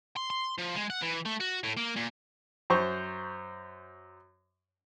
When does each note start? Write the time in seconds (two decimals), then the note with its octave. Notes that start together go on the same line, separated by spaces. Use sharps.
0.17 C6
0.30 C6
0.58 F3
0.75 G#3
0.90 F#5
1.02 E3
1.26 A3
1.41 F#4
1.64 A2
1.77 A#3
1.96 A#2
2.70 F#2 C5 C#6